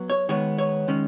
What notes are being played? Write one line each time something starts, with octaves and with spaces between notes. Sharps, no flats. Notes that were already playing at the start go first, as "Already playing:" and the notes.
Already playing: F#3 B3
C#5
D#3 G#3 B3 C#5
C#5
D#3 G#3 C#4